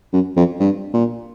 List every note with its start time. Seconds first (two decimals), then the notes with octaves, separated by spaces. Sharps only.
0.13 F#2
0.36 F2
0.60 G2
0.93 A#2